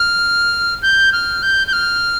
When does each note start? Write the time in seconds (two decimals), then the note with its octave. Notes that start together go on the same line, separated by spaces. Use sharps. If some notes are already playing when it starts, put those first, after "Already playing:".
Already playing: F6
0.82 G6
1.13 F6
1.43 G6
1.67 G6
1.73 F6